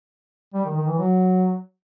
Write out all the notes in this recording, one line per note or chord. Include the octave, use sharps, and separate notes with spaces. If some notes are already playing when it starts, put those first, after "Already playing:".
G3
D#3
D#3
E3
F#3